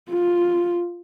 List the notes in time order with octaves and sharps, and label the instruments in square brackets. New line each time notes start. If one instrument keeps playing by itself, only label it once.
[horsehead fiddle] F4